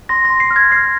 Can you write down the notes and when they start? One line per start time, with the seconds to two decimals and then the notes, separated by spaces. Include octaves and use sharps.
0.09 C6 A#6
0.25 A#6
0.30 C6
0.40 C7
0.51 F6
0.56 G#6
0.71 F6 C7